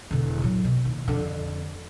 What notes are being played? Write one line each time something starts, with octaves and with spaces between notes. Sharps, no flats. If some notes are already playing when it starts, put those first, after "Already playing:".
E1 D3
A#2 F#3
B2
D#2
F2 D3